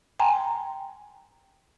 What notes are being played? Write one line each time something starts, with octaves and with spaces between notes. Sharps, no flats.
G5 G#5 A#5 C6